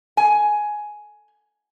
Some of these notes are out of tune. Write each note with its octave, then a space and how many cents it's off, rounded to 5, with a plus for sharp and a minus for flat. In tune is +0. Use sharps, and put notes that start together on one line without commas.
G#5 +10